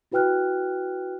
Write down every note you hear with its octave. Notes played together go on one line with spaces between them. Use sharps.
E4 F#4 B4 G5 F6 F#6